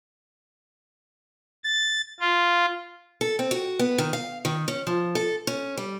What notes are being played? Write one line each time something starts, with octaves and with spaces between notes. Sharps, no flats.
A6
F4
A4
C4
F#4
B3
D#3
F5
D#3
C#4
F3
A4
C#4
G3